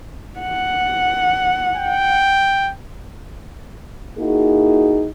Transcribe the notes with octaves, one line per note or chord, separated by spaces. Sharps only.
F#5
G5
A#3 D#4 E4 F#4 G#4